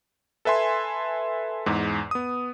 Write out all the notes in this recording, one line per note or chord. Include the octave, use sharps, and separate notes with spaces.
A4 B4 E5 G#5 C6
E2 G#2
B3 D#6